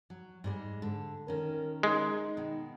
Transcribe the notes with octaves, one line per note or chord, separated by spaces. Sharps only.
F#3
G#2 G3 G#3
D3
D#3 C#4 A#4
G#3 D#4
B2 D#3